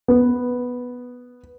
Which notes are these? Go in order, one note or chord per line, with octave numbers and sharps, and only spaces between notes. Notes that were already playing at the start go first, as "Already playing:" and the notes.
B3